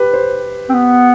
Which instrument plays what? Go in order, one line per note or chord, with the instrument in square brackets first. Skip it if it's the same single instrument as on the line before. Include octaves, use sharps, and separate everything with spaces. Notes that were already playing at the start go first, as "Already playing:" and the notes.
Already playing: [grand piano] G4 B4
C5
[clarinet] C4
B3